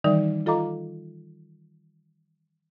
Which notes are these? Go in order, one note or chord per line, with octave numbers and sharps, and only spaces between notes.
D#3 E3 G3 D#4 A#4 D5
F4 A4 D#5 F5 A#5 D6